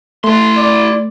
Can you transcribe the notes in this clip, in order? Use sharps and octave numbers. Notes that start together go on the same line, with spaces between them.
A3 E4 C6
D5